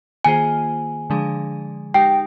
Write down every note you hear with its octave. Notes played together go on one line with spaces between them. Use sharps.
D#3 A#3 F4 G#4 C5 G#5
D3 F3 G#3 D4 G#4
G#3 D#4 G4 G5